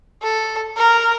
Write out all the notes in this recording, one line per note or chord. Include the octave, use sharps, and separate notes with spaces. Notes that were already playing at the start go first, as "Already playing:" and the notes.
A4
A#4